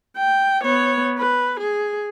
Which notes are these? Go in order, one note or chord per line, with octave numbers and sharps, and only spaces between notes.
G5
B3 C#5
B4
G#4